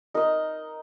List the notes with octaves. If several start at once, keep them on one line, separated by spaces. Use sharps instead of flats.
D#4 A#4 D#5